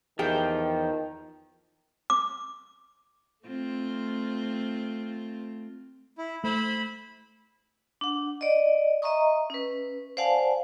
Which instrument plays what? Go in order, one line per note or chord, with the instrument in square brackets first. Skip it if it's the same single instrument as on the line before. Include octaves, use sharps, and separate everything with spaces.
[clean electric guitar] E2 F3 [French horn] D#3 [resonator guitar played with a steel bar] G4 G5 [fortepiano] G#4
[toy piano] D6
[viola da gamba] A3 C4 F4
[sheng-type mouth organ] E4
[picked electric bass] A3 [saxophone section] E4 C5 [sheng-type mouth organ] B5
[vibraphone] D4 F#5
D5 D#5
D#5 E5 A#5 C#6 D#6
C#4 B4
C5 D5 F5 F#5 G#5 A5